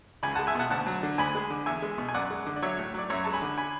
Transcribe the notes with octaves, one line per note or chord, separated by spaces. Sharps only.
C#2 G#5 B5
G#3 F#5 A5
E5 G#5
B2 F#5 A5
D2 F#5 A5
F#3
D3
D2 G#5 B5
G#3
D3
E2 E5 G#5
G#3
B2
G#5
F#2 D5 F#5
G#3
D3
D5
F#3 C#5 E5
A2
F#3 D5
F#2 C#5 E5
G#3 A5
G#5 B5
D3
G#5 B5